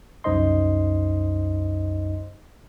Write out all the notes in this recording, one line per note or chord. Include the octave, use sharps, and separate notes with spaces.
C2 F#2 D#4 C5 D#5 C6